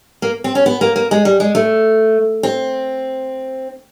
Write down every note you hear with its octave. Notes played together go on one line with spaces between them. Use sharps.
A#3
C4
C#4
B3
A#3
A#3
G#3
G3
G#3
A3
C4